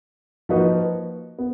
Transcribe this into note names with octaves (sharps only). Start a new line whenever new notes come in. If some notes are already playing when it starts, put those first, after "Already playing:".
F3 A#3 D#4 F#4 B4
B3